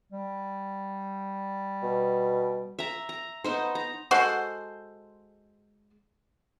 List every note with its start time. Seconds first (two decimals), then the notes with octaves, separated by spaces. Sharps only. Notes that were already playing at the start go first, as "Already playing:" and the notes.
0.12 G3
1.83 B2
2.79 E5 A#5
3.09 A#5
3.44 B3 D#4 C5
3.75 A#5
4.11 G#3 F#4 A4 C5